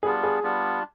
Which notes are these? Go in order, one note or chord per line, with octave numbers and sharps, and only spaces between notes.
G3 B3 D4 F4 G#4
G#4
G3 B3 D4 F4